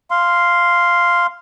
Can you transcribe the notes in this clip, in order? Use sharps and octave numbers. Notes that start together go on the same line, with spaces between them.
F5 C6